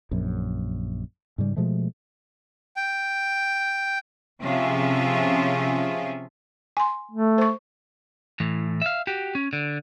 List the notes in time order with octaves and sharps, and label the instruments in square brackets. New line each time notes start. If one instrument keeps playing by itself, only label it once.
[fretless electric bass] A#1 F#2
G#2 C#3 G3
B2 F3 G#3 A3
[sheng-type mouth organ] G5
[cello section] C3 F3 C#4 F4 G#4 E5
[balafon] G#5 C6
[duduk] A3
[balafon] C5 C#6
[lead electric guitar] A2 E3
E5 F5
F#4 G4
C#4
D3